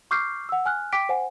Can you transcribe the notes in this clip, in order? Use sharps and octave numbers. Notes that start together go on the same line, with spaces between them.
C#6 D6 F6 G6 C7
F#5 E6
G#5 F6 F#6
G5 D6 B6 D7
C5 F#5 G#5